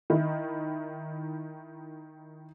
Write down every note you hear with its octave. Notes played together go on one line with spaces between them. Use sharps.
D#3 E4 D#5